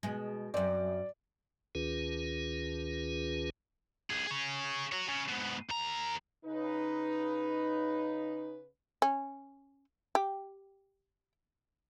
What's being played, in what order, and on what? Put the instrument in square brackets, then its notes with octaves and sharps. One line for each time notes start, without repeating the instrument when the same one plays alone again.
[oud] B2 G#3
[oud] F#2 C4 [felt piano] D5
[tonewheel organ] D2 D#3 C#4 F4 G#4 B4
[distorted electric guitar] C2 G#4
G#4 C#5
F#4 C#5
C#3
G#2 B2
D#2 A#5
[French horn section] C#3 B4 [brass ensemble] D#4
[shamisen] C#4
G4